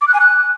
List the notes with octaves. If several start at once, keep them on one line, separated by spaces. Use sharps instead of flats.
D6
F#6
G#5
F#6